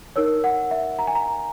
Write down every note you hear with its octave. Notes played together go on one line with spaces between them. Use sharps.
D#4 A#4 C#5 E6
F#5
E5
A#5
G#5
A#5